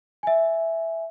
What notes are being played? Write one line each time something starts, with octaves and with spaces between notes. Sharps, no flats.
E5 G#5